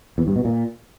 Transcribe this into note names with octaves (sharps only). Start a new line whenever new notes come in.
E2
G2
B2
A#2